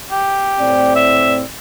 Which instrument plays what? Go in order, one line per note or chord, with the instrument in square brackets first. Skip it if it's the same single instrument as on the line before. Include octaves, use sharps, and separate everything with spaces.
[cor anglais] G4
[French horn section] A2 C4 D5
[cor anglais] E5